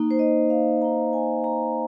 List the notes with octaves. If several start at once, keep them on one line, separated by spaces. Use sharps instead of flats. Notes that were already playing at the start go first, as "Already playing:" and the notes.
Already playing: A#3 D#4
C5
D#5
F5
A#3 D#4 A#5
G#5
A#5